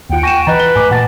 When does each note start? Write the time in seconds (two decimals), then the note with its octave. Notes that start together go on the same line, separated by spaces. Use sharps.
0.10 D#2 F4 F#5 G5
0.23 G#5 C#6 G6 A#6 D#7 E7
0.47 E3 B4 D#5 A#5 F#6 A6
0.60 G7
0.76 A2 G#5 D6
0.91 A#2 D#5 F#5 A5 A6